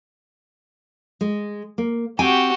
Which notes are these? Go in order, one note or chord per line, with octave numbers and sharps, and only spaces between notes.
G#3
A#3
C4 F#4 G4 G5 G#5